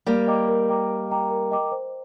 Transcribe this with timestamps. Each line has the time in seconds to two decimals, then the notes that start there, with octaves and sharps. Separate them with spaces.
0.06 G3 A#3 A#4
0.27 D#5 G5 A#5 D6
0.48 A#4
0.68 D#5 G5 A#5 D6
0.89 A#4
1.10 D#5 G5 A#5 D6
1.31 A#4
1.51 D#5 G5 A#5 D6
1.72 C5